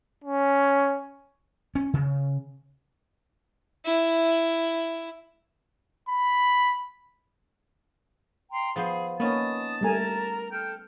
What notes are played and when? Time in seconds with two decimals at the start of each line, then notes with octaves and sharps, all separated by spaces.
0.24 C#4
1.75 C#4
1.94 C#3
3.86 E4
6.09 B5
8.51 G5 A#5 C6
8.76 F3 B3 G#4 C5
9.20 A#3 B3 C#4 D#4 A5 D#6
9.81 G3 A3 A#4 G#5 A#5
10.52 A4 G5 F6